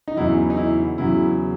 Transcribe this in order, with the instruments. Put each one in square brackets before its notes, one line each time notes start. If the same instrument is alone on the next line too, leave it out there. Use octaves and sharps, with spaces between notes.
[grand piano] D#4
E2 C#3 F#3 E4
D#4
E4
E2 C#3 F#3 E4